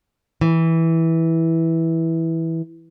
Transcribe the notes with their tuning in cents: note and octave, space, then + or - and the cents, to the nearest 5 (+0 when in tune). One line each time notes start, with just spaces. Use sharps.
E3 -10